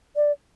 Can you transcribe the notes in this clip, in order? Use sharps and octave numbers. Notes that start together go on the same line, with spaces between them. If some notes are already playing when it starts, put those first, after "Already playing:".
D5